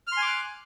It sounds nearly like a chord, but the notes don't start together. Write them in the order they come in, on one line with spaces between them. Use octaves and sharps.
F6 C6 G#5 D6 F#6